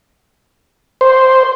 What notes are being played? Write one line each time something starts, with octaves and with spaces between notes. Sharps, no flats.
C5